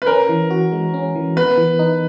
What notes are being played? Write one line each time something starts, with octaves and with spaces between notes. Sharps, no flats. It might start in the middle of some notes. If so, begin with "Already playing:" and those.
B4
C#4 A#4
E3
F#4
G#3
C#4
E3
B3 B4
E3
D#4